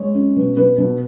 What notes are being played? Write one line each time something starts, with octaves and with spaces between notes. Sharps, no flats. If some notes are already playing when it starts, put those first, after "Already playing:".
Already playing: G#3 C#5
C#4
B2
B2 B4
B2